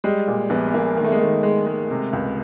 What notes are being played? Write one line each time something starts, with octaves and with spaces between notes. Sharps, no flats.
G3 G#3
A#2
A#1 B3
B3
A#1 A#3
D#3 A#3
A3
G#3
D#3 A3
G#3
G#3
C3
C#2